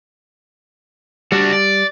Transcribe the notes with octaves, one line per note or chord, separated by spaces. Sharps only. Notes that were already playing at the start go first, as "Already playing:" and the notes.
G3 D4 F#4
D5